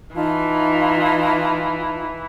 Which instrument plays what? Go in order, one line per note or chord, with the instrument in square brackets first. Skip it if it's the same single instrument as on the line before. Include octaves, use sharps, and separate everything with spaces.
[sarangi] E3 [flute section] D#4 F4 A5